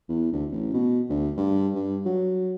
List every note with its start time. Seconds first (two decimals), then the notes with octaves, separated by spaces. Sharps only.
0.09 E2
0.32 D2
0.52 A1
0.74 B2
1.10 D2
1.37 G2
1.75 G2
2.06 F#3